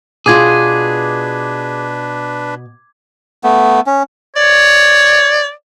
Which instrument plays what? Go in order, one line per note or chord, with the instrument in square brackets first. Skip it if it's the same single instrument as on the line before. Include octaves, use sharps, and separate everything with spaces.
[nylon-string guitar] B2 F4 [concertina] D4 B4 [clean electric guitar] G#4 [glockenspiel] D6 G#6
[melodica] A3 B3
C#4
[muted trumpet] C#5 [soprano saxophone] D5